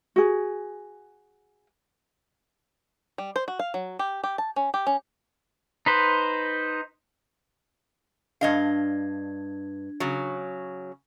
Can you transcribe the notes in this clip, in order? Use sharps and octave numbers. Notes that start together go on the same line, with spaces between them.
F#4 G#4
G3
C5
F#4
F5
F#3
G4
G4
A5
C#4
G4
C#4
D#4 B4 C5
G2 D4 D#5 F5 G#6
C#3 F#3